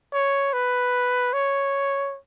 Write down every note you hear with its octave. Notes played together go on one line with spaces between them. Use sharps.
C#5
B4
C#5